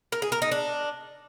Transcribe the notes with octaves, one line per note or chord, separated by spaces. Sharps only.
A#4
G#4
A#4
D#4
D4